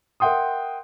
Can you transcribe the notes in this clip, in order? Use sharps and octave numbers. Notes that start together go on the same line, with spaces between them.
A#4 E5 F#5 G5 C6 D#6